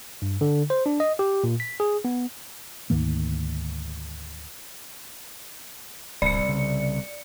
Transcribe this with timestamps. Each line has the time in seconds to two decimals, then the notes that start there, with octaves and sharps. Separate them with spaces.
0.22 G2
0.41 D3
0.70 C5
0.86 D4
1.00 D#5
1.19 G4
1.44 A#2
1.60 B6
1.80 G#4
2.05 B3
2.90 D2 G#2 D#3 A#3
6.22 D1 C2 D5 C#7
6.49 C#3